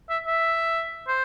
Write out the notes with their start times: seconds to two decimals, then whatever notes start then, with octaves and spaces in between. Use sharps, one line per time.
0.10 E5
0.27 E5
1.08 C5